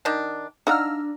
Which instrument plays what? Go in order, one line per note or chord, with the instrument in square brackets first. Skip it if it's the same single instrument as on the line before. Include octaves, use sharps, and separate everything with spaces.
[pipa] D#3 D4
[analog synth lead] D4 [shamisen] D#4 D5 F#5 [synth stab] F5 E6 F6 [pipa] A#5